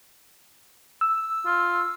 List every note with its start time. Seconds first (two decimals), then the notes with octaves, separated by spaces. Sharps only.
1.01 E6
1.46 F4